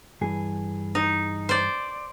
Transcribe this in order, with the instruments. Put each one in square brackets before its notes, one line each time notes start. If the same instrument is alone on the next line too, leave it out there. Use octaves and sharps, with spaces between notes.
[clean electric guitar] G2 E3 G#4
[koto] D#4
C5 D5